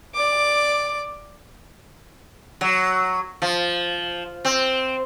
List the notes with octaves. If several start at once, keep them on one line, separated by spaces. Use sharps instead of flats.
D5 D6
F#3
F3
C4